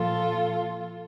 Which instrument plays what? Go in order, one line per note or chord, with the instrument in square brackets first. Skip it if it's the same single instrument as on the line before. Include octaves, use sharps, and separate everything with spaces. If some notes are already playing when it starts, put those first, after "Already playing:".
Already playing: [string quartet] A#2 F3 F4 A4